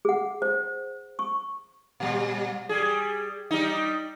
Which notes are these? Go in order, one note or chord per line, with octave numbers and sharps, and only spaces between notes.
G#4 F#5
C5
C#6
A#2 G3
G3 G#4
G3 D#4